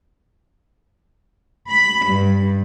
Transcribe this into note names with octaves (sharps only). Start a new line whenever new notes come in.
B5
G2